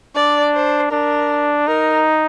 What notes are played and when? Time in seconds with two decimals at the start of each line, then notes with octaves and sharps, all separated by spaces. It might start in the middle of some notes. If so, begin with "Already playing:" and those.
0.15 D4 D5
0.54 C5
0.91 D4 A#4
1.67 D#4 A#4